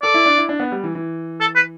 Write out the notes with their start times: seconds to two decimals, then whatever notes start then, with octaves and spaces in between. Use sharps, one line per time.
0.02 A4 D5
0.14 E4
0.26 D4
0.37 E4
0.49 D4
0.60 B3
0.72 G3
0.84 E3
0.95 E3
1.41 A4
1.56 B4